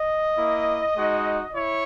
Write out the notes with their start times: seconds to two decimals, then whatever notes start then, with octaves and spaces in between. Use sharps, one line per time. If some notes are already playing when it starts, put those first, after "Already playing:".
Already playing: D#5
0.36 A#3 E4
0.96 G#3 D#4 F#4
1.54 E4 C#5